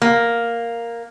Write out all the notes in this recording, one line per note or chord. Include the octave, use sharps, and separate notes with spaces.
A#3